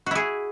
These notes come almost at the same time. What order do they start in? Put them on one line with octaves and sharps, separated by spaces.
F#4 E4 G#4